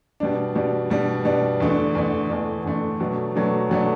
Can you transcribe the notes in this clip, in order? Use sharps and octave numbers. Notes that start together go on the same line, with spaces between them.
B2 G3 D4
B2 G3 D4
B2 G3 D4
B2 G3 D4
E2 D3 A3 D4
E2 D3 A3 D4
E2 D3 A3 D4
E2 D3 A3 D4
B2 F#3 A3 D4
B2 F#3 A3 D4
B2 F#3 A3 D4